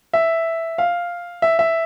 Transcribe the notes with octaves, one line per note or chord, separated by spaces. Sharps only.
E5
F5
E5
E5